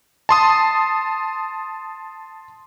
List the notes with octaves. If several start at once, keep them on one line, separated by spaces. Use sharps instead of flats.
A5 C6 D#6